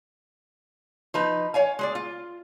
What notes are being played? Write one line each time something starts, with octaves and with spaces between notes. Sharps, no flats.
F3 D#4 B4
C#5 F5 G#5
G#3 G#4 D5
F4